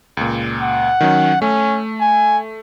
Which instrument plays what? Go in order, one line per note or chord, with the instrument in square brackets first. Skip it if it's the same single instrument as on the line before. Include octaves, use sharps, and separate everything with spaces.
[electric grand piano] C#2 A#2
[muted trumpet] F#5
[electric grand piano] D#3 F#3 C#4
[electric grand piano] A3 [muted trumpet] C#4
[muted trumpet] G#5